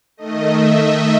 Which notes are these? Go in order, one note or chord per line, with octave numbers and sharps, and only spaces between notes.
D#3 A3 D#5
E5
D#5